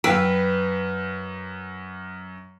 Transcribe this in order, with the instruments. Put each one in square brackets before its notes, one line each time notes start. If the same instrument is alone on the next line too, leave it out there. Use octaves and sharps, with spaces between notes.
[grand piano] F#2 F5 [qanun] B4 [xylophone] G5 E6 D7